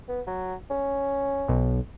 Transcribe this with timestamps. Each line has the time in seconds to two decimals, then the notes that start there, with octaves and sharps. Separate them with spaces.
0.08 B3
0.27 F#3
0.70 C#4
1.48 B1